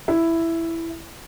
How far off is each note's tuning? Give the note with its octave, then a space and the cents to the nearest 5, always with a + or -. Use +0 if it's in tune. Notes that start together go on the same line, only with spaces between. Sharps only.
E4 +5